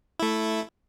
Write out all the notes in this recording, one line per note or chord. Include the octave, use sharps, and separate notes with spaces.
A3 E4